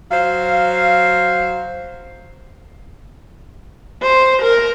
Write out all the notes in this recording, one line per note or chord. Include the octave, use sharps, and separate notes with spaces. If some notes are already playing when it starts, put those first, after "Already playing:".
F#3 C5 F5
C5
A#4